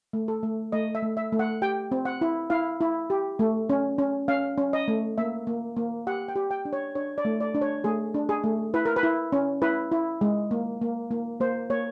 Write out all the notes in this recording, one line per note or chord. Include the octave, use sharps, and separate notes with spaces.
A3
A4
A3
A3 D#5
E5
A3
E5
A3
F#5
G4 G5
C4
F#5
E4
E4 F5
E4
G4
A3
C#4
C#4
C#4 F5
C#4
D#5
A3
A#3 E5
A#3
A#3
G4 F#5
G5
G4
G5
D4
C#5
D4 C#5
D5
A3
D5
D4
C#5
A3 G#4
D4
G#4
A3
E4 B4
A#4
B4
E4
C#4
E4 B4
E4
G#3
A#3
A#3
A#3
A#3 C5
A#3 C#5